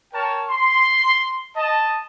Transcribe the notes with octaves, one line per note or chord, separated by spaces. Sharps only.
A#4 C#5 G5 A5
C6
D#5 A5